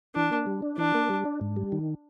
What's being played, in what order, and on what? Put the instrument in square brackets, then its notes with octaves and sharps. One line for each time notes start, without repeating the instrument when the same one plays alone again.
[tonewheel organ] E3 [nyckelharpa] D4
[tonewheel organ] A#3
G3
D4
[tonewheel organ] E3 [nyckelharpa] D4
[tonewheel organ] A#3
G3
D4
G#2
G3
D#3